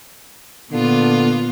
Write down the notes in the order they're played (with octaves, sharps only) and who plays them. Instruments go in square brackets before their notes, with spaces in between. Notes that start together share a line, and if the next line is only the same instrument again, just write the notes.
[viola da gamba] A#2 B3 F4 [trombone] D3